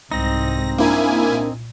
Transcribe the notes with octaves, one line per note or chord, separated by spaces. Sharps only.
C2 G#2 C4 D#4 A#6
A#3 D4 E4 A#4 G#5
A#2